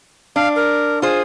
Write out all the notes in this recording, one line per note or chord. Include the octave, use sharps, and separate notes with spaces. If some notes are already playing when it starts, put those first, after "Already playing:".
D4 F5
A#4
F4 G#4 C5